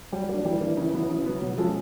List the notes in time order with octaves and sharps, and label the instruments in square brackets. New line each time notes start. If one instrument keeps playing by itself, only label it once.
[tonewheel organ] F#3 [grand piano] G3
[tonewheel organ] F#3 [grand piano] A#3 D4
[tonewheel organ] E3 [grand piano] G3
[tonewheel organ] E3 [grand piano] A#3 D4
[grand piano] C#3
F#3 B3
C#3
F#3 B3
[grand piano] B2 [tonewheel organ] F#3
[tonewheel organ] F3 [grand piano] G#3 C#4 F4 A4